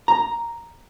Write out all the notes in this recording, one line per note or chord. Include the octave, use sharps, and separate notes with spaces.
A#5